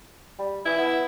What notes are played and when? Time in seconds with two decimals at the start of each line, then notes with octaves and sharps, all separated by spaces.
0.39 G3
0.66 E3 E4
0.78 B3